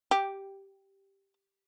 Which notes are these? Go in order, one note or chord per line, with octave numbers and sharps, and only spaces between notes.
G4